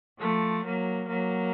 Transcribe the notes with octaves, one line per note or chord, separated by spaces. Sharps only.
F3 A3
F#3 A#3
F#3 A#3